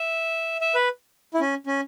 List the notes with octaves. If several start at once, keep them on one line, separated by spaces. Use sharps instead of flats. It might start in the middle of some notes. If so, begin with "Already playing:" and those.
Already playing: E5
E5
B4
E4
C#4
C#4